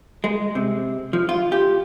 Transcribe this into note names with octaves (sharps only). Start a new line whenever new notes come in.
G#3
C3
F3
F4
G4